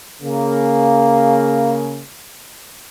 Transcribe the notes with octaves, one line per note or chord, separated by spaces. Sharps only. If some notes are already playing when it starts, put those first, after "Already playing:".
C#3 A#3